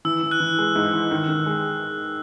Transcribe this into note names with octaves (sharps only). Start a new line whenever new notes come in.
E3 E6
E3
F#6
E3
G#3
G#2
E3
D#3
D#3
G#3